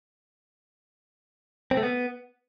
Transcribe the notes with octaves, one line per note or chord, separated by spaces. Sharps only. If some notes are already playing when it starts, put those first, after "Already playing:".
C4
A3
B3